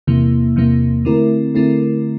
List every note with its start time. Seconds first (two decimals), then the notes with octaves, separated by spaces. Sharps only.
0.07 E2 C3 E3 A#3
0.56 E2 C3 E3 A#3
1.05 D3 A3 C4 E4 A#4
1.55 D3 A3 C4 E4 A#4